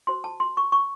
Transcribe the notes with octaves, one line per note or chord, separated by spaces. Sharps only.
F#4 C5 C6
A5
C6
C#6
C#6